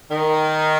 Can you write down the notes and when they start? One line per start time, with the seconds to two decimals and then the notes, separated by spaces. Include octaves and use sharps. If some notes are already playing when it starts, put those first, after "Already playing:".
0.11 D#3